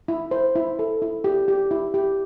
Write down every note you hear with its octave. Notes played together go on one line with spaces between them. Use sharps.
E4
C5
E4
A4
E4
G4
G4
E4
G4